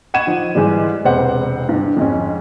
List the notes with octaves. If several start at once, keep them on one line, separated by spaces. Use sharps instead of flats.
F#5 B5 C#6 G#6 D#7 E7
F3 D#4
G#2 E3 G3 G#3
E1 C3 B4 C5 F#5
G2 D3
F2 G#2 C#4